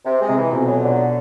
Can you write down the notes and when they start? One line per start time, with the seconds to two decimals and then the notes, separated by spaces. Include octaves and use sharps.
0.05 C3
0.21 G#3
0.29 C3
0.37 E3
0.52 F2 B2
0.67 F#3
0.83 D3